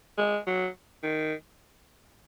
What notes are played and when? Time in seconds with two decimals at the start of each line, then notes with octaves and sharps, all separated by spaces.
0.18 G#3
0.47 F#3
1.03 D#3